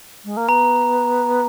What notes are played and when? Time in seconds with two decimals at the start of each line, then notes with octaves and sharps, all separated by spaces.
0.25 G#3
0.37 A#3
0.49 B3 A#5